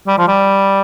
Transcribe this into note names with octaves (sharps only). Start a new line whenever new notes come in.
G3
F3
G3